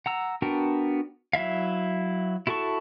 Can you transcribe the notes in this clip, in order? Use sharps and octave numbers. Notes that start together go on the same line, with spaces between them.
F#5 A#5 E6
B3 D4 F#4 A#4 G5
F#3 E4 E5 F5
E4 F#4 A4 A5 C#6